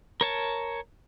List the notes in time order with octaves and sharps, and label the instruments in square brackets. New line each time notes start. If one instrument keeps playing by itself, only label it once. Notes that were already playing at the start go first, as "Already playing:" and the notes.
[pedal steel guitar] A#4 C#5 A5